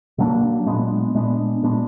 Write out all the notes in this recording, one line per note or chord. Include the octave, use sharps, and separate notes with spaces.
B2 F#3 A#3 D4
A#2 G#3 B3 D4
A#2 G#3 B3 D4
A#2 G#3 B3 D4